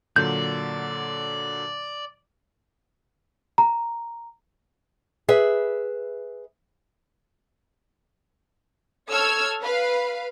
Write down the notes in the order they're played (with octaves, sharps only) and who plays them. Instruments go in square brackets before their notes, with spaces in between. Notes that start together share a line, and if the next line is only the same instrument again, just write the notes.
[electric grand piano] A#2 D3 F#3 [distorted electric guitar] D5 [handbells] G6
[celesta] A#5
[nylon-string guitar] G#4 B4 E5
[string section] A4 C#5 E6 F6 G#6
B4 F5